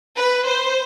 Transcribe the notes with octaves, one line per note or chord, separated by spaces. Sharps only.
B4
C5